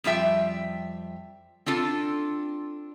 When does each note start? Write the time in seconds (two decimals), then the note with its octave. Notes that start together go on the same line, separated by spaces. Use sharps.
0.04 F2 G3 F4 E5 G5
1.66 C4 D4 F4 A4